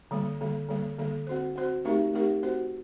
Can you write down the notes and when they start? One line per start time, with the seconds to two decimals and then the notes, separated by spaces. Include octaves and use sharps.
0.11 D3 G3 A#3
0.41 D3 G3 A#3
0.69 D3 G3 A#3
0.99 D3 G3 A#3
1.27 C4 F#4 C5
1.56 C4 F#4 C5
1.85 A3 C4 D#4 G4 A#4
2.13 A3 C4 D#4 G4 A#4
2.42 C4 F#4 C5